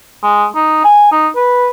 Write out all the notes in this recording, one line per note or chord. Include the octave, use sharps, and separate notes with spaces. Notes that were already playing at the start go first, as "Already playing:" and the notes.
G#3
D#4
G#5
D#4
B4